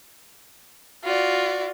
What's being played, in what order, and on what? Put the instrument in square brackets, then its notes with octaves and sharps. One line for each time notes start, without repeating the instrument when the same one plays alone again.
[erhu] F4 [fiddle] F#4 D5